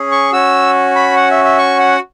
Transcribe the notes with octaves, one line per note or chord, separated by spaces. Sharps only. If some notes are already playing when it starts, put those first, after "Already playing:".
Already playing: C#4 G#4
C#6
C#4 F#4 E6
B5
F#5
E5
E5
C#6
F#5